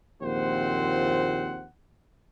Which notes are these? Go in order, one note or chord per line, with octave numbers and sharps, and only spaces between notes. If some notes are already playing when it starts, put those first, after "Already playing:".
A#1 D#2 C4 F4 C5 F#5